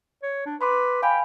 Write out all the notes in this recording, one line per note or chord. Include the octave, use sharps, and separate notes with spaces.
C#5
D4
B4 B5 C6 D6
F5 G5 G#5 B5